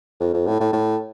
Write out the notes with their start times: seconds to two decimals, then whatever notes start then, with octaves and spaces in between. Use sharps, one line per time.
0.21 F2
0.34 F2
0.47 A2
0.60 A2
0.73 A2